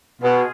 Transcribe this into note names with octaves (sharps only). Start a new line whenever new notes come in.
B2 F4 G#4